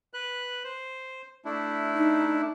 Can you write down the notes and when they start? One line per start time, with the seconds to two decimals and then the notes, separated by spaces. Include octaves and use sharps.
0.14 B4 F#6
0.64 C5
1.45 A3 D4 E4
1.96 D#4